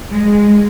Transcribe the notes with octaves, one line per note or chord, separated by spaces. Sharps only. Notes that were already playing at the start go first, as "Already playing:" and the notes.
G#3